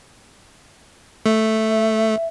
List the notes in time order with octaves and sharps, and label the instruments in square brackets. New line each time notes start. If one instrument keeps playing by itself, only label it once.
[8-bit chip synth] A3 [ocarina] E5